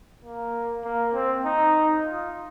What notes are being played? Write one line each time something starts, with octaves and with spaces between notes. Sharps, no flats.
A#3
A#3
C4
D#4
F4